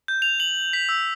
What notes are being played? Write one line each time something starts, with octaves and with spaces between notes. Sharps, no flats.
G6
F7
F#7
B6
E6